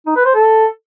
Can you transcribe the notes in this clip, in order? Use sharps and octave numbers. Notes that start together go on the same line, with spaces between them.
D#4
B4
C5
A4